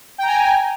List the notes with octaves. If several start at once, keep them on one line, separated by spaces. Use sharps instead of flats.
G5 G#5 A#5